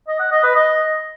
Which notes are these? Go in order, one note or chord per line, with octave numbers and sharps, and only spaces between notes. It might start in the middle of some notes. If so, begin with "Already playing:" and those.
D#5
F#5
D#5
B4
D#5